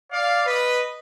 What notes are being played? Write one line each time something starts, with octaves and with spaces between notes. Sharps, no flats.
D5 F5
B4 D#5